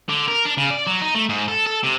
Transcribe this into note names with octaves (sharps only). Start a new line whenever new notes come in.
D3
A#4
D4
C#3
D5
F#3
D#4
A3
G#2
A4
A4
C3